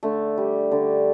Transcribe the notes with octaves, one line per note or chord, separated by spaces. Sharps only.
D3 A3
G3
D3